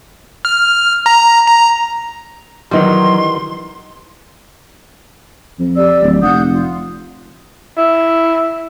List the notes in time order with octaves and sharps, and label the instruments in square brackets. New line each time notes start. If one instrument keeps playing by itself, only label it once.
[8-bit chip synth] F6
A#5
A#5
[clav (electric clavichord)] D#3 E3 G3 [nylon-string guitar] F#3 D#4 [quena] C6
[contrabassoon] F2
[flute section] G4 D5 E6
[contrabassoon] D1
[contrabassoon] F1 [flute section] F#5 D#6 G6
[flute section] F4
[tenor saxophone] E4